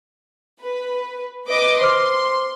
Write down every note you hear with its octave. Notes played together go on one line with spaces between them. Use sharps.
B4
B4 D#5 D6
C5 C6 D6 F6